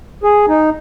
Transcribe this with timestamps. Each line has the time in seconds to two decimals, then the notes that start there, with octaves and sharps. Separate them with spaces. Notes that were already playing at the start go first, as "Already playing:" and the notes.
0.24 G#4
0.49 D#4